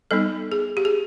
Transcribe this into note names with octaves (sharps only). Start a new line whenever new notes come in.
G3 B3 D#4 A4
G#4
G4
G#4